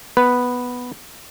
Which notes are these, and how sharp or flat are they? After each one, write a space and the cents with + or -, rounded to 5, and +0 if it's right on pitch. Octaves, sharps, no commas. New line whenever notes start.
B3 +0 B4 +0